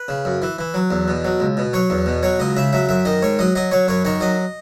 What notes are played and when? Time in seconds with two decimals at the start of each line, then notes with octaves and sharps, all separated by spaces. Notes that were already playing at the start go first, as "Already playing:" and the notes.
Already playing: B4
0.08 C#3
0.25 F#2
0.42 E3
0.59 E3
0.74 F#3
0.91 E2
1.08 B2
1.25 F#3
1.40 C#2
1.57 B2
1.73 F#3 C#5
1.90 E2
2.06 B2
2.23 F#3 C#5
2.39 C#2 D#5
2.57 C#3 E5
2.73 F#3 E5
2.89 F#2 E5
3.05 D#3 D#5
3.22 G#2 C#5
3.39 F#3 D#5
3.55 F#3 D#5
3.71 F#3 C#5
3.88 F#2 C#5
4.05 D#3 C#5
4.21 F#3 D#5